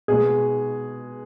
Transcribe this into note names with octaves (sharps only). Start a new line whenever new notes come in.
B2 G#3 G#4